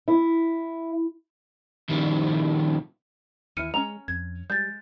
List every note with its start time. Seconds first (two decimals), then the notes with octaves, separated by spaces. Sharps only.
0.08 E4
1.89 A#2 D#3 F3 G3
3.57 D#2 E3 E4 F6 C#7 D#7
3.74 G#3 C#4 A#5 F7
4.08 F2 G#6
4.50 G3 G#3 G6 A6